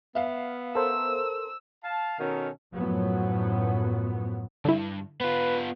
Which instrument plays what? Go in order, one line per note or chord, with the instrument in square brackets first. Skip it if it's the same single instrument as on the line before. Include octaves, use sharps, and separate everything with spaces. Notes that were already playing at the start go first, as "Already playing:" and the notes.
[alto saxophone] B3 [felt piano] E5 F5
[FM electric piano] A4 A#4 C5 [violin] E6
[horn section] F5 A5
B2 D#3 C#4 F#4 A4 A#4
[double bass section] F#2 A2 F3 F#3 B3
[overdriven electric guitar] G2 [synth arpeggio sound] D3 E4
[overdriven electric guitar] B3 F4 [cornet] B4